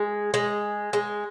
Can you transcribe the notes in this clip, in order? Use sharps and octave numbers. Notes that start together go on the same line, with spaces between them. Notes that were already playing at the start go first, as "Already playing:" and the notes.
Already playing: G#3
G#3
G#3